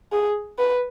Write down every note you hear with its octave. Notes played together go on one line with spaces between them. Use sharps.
G#4
B4